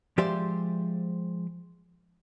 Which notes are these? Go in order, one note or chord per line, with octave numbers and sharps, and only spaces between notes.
F3 G#3 G4 C5 D5 E5